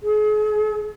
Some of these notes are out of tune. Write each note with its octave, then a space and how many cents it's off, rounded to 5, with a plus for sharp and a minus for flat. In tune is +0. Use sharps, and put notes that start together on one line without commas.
G#4 +40